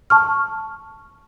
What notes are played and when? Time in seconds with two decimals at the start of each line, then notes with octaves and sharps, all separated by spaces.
0.10 A5 C#6 F6